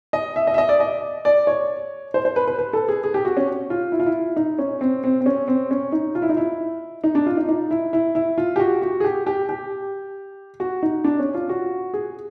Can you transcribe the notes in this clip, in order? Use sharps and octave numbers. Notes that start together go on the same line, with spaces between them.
D#5
E5
D#5
E5
D#5
D5
D#5
D5
C#5
C5
C5
B4
B4
B4
A4
G#4
G#4
G4
F#4
C#4
F4
E4
F4
E4
D#4
C#4
C4
C4
C4
C#4
C4
C#4
D#4
F4
E4
D#4
E4
D#4
D4
F4
D#4
D#4
E4
E4
E4
F4
G4
F#4
F#4
G#4
G4
G4
G4
F#4
D#4
D4
C#4
F4
F#4
G#4